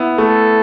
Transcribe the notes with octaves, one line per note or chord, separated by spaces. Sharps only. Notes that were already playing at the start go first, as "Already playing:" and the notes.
Already playing: B3 E4
A3 A4